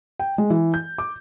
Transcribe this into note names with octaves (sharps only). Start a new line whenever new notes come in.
G5
G#3
E3
G6
D6